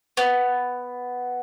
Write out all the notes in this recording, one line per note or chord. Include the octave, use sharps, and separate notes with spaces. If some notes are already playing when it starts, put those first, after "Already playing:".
B3